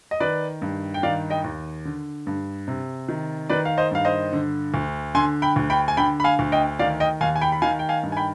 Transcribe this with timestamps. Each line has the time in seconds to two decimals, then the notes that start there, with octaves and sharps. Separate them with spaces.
0.11 D#5
0.20 D#3 B4 D5
0.62 G2
0.94 G5
1.03 D#3 D5 F5
1.30 D#5 G5
1.44 D#2
1.85 D3
2.27 G2
2.68 C3
3.08 D#3
3.49 D#3 B4 D5
3.65 F5
3.78 C5 D#5
3.91 G2 F5
4.05 C5 D#5
4.33 D3
4.74 D2
5.15 D3 G#5 C6
5.42 G5 B5
5.56 D2
5.70 G5 B5
5.88 G#5
5.97 D3 G5 B5
6.20 B5
6.24 F5 G#5
6.39 D2
6.52 D#5 G5
6.79 D#3 D5 F5
7.00 D#5 G5
7.21 D#2 F5 G#5
7.35 G#5
7.41 G5 B5
7.52 B5
7.62 D#3 F5 G#5
7.79 G5
7.89 F5 G#5
8.03 G2
8.12 G#5
8.17 G5 B5